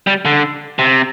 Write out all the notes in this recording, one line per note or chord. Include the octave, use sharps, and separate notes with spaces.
G3
D3
C3